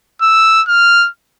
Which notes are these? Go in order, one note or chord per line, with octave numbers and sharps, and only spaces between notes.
E6
F6